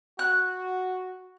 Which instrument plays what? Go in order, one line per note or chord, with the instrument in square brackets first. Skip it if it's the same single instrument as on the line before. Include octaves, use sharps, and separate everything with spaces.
[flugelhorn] F#4 [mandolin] F#6